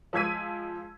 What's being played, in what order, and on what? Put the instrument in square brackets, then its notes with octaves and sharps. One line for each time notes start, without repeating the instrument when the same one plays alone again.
[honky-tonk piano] F3 G#3 E6 G#6 B6 D#7